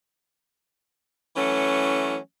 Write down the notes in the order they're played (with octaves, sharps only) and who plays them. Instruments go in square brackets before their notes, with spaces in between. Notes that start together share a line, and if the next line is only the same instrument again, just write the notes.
[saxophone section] E3 F#3 A3 C#4